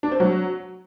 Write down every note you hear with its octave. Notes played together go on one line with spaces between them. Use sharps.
D4
C4
F#3